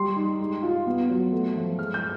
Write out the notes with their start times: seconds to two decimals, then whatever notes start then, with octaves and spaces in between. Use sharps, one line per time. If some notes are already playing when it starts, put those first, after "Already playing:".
Already playing: G3 C6
0.16 D#4
0.39 G#3
0.63 F4
0.87 B3
1.09 F#3
1.32 A3
1.55 F3
1.79 G#3 F6
1.94 G6